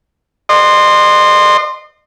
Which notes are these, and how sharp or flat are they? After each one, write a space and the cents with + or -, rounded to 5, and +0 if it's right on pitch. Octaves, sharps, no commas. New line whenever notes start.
D#5 -40 C6 +0